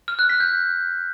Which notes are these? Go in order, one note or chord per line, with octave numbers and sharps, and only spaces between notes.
F6
F#6
B6
G6